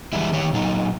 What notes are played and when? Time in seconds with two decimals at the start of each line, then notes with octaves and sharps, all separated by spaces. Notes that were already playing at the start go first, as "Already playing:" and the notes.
0.13 E3 G3 G#3 E4
0.33 D#3 G4 C#5
0.53 A#2 F#3 D#4